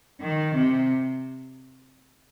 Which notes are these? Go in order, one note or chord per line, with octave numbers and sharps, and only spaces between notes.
D#3
C3